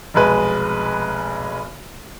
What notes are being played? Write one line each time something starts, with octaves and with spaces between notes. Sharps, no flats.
F1 B1 G#3 B4 G#5